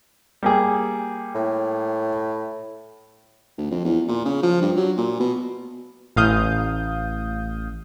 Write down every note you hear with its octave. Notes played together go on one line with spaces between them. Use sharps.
G3 A#3 G#4
A2
D2
F2
E2
A#2
C#3
F3
G2
F#3
A#2
B2
A1 F5 D#6 G6